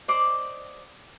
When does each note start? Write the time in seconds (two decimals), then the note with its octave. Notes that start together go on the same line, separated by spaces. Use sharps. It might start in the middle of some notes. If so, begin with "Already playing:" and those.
0.08 C5 D5 D#5 D6